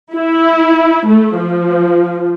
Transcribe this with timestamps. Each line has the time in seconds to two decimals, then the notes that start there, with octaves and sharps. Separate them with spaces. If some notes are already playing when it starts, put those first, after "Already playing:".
0.15 E4
1.07 A3
1.38 F3